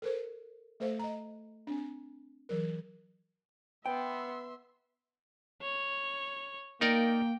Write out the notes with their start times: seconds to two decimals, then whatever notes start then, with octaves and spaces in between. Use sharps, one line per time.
0.02 A4 A#4 C5
0.80 A3 A4 C5 F5
0.99 D#5 A#5
1.67 C4 D4
2.49 E3 F#3 A#4
3.86 B3 E5 G5 C6
5.62 C#5
6.81 A#3 D#4 A#4 D5 G5